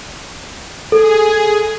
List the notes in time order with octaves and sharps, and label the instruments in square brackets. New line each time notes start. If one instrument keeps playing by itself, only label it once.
[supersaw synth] G#4 [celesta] A4